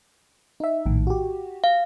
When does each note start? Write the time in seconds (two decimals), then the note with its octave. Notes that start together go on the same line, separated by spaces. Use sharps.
0.60 D#4 E5
0.86 A#1 A2 D#3
1.07 F#4 G4
1.64 F5